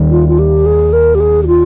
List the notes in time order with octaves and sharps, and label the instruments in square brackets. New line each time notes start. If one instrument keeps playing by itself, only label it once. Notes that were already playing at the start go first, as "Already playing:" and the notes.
Already playing: [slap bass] D#2 D#3 G3
[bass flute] F4
F4
G4
G#4
A#4
G4
G#4
G4
F4